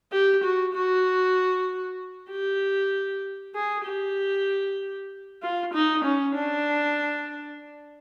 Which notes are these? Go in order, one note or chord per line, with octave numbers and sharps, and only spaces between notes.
G4
F#4
F#4
G4
G#4
G4
F4
D#4
C#4
D4